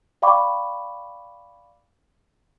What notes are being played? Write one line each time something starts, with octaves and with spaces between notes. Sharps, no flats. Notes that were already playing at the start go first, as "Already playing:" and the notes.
D5 F5 G5 B5 C#6 D6